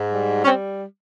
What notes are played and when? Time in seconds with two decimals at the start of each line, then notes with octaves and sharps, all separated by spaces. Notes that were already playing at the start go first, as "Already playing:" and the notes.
Already playing: G#2
0.11 G3
0.44 C#4
0.47 C4